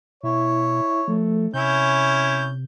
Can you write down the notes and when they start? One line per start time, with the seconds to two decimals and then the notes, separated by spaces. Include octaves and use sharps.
0.23 B2 E4 C#5
1.08 F3 A3
1.54 C3 C#4 E4 G6